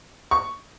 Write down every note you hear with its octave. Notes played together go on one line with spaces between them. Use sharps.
C#6